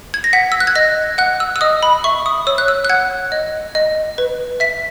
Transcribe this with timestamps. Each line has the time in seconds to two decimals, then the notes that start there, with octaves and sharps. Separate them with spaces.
0.14 G#6
0.24 A#6
0.33 F#5 B6
0.52 E6
0.60 F#6
0.67 G#6
0.75 D#5 A#6
1.18 F#5 F#6
1.40 E6
1.56 E6
1.61 D#5 D#6
1.83 B5
2.04 E5 C#6
2.26 D#6
2.47 C#5 E6
2.58 F#6
2.68 E6
2.85 F#6
2.89 F#5 G#6
3.32 D#5
3.75 D#5
4.18 B4
4.60 E5 B6